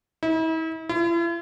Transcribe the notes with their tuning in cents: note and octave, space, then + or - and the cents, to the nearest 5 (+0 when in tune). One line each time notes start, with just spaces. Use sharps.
E4 -40
E4 +45